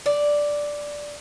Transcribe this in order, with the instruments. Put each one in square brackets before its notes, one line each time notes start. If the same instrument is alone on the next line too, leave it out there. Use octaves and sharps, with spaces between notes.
[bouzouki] D5